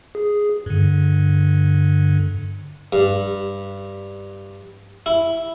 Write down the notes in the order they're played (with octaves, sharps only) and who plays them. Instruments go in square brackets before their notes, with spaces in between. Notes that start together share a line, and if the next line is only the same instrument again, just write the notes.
[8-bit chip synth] G#4
G2 D3
[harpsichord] G2
E4